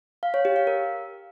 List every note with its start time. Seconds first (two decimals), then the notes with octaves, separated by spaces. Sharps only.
0.23 F5
0.34 C#5
0.45 G4
0.56 F5
0.67 A#4